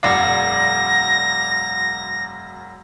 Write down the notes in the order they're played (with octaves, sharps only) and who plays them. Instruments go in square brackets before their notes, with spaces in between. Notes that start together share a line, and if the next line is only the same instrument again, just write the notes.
[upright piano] E1 F#2 D5 [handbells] F5 F#5 [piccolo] A#6